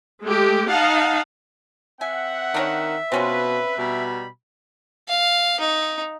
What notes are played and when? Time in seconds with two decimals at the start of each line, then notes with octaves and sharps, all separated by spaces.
0.21 G#3 A3 G4
0.67 D#4 F5 F#5 A5
2.01 C4 E5 F#5 G#5
2.54 D#3 D4 A#4 C#5
3.12 B2 C4 C#4 F4 B4
3.78 B2 G3 A#5 B5
5.08 F5
5.60 D#4